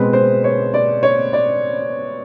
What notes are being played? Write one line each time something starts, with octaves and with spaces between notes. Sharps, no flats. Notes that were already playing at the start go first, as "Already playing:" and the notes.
Already playing: B2 G#3 C4 B4
C5
C#5
D5
C#5
D5